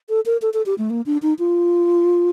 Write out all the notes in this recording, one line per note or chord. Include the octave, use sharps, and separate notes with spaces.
A4
A#4
A4
A4
G4
A3
A#3
D4
D#4
F4